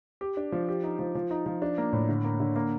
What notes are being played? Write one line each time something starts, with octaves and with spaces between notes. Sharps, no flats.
G4
D4
F3
G4
D#4
F3
F3
D#4
F3
D4
A#3
A2
D3
A#3
D3
A#3